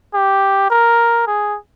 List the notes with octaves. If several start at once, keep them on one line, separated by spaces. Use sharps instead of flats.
G4
A#4
G#4